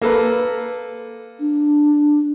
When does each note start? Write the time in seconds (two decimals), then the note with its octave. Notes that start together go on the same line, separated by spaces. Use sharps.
0.02 A#3 A4 B4
1.40 D4